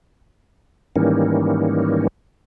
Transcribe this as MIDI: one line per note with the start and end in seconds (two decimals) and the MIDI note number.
0.96 2.07 44
0.96 2.07 51
0.96 2.07 52
0.96 2.07 55
0.96 2.07 58
0.96 2.07 61